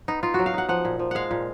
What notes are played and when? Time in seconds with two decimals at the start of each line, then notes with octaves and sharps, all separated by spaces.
0.08 B3 D#4
0.23 D#4 F4
0.34 F#3 F#4
0.46 F5
0.54 D#4 F#5
0.69 F3 F#5
0.85 A#2
0.99 F3
1.11 G#3 F5 F#5
1.31 A#2